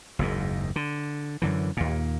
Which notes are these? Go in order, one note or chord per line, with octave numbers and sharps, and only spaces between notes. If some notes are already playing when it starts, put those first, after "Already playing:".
F#1 D#2 G#2
D3
F#2 D3 E3
D#2 A#2